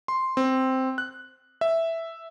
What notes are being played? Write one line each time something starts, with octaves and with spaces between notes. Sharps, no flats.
C6
C4
F#6
E5